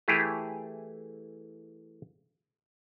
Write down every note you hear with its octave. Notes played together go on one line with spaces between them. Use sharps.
E3 A3 E4 G4 G#4